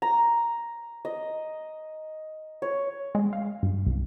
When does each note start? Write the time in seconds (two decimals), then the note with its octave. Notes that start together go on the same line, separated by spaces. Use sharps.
0.02 A#5
1.05 D#5
2.62 C#5
3.15 G#3
3.33 F5
3.63 G2
3.86 C2